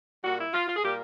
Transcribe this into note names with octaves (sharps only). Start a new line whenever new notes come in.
A#2 G3 A#3 F#4
E4
F4
F4
G#4
A#2 G3 A#3 G4